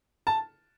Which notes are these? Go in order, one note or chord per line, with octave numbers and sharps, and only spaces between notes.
A5